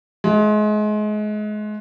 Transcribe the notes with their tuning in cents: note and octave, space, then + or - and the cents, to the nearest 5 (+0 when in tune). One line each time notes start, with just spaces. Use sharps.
G#3 +30 F4 -35